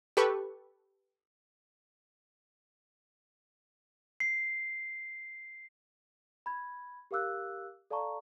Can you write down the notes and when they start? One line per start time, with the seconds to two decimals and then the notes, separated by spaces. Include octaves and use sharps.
0.17 G4 A4 B4 C#6
4.20 C7
6.46 B5 G#6
7.11 G4 A#4 F5 D6 E6 F#6
7.90 A4 D5 F5 A5 A#5 C#6